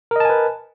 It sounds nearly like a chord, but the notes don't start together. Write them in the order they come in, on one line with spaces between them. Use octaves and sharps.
A#4 D#5 A5 G#5 B4